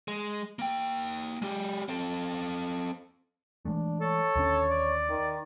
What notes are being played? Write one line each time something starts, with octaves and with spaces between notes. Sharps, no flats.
G#3
A#3 G5
G#3 G4
C4 A4
E3 G#3 A3 D4
A4 C#5
D#2 D3 C#4
D5
D#3